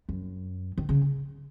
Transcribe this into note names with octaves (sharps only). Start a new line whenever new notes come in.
F#2
D#3
C#3